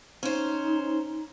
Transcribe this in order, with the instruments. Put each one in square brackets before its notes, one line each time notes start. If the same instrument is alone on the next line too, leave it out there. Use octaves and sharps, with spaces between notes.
[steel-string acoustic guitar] C#4 C5 [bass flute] D#4